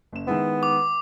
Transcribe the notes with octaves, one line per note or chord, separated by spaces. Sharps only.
F#1 E7
D#3 G#3 B3 E4
D6